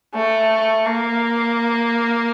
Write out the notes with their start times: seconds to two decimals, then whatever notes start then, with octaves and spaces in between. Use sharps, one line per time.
0.14 A3
0.86 A#3